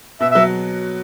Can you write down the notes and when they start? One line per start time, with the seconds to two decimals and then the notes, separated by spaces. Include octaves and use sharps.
0.20 B2 E5
0.31 F#3 E5